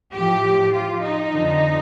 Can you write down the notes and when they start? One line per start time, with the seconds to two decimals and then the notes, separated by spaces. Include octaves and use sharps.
0.14 A2 F3 G4
0.74 F4
1.03 D#4
1.33 F2 D3 F3